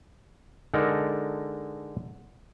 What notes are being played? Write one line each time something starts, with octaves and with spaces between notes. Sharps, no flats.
D3 G#3 D#4 A4 A#4